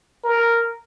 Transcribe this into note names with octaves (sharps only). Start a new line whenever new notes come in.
A#4